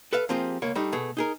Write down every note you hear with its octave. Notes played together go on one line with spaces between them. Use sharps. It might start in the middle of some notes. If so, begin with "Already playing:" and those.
A4 B4 E5 F5
F3 A#3 C4 F4 G4 G#4
C#2 A#3 C#5
G3 A3 D4 D#4
B2 A3 G#4
D#4 G#4 A#4